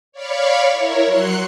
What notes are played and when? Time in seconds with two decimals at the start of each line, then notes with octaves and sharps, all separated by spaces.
0.12 C#5 D5 F5 B5 C#6
0.71 E4 A#4 C#5
1.06 F#3 C6 F#6 C#7